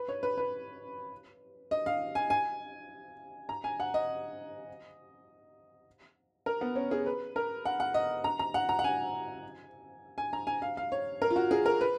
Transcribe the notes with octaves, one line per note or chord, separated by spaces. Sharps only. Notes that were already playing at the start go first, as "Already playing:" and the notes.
Already playing: B4
C#5
B4
B4
D#5
F5
G#5
G#5
A#5
G#5
F#5
D#5
A#4
B3
C#4
G#4
B4
A#4
F#5
F#5
D#5
A#5
A#5
F#5
A#5
F#5
G#5
G#5
A#5
G#5
F5
F5
C#5
A#4
F4
F#4
G#4
A#4
B4